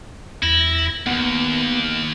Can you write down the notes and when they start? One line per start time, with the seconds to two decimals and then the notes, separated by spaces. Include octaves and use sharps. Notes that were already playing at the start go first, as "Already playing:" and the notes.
0.43 E2 E4 A#6
1.07 D#2 B3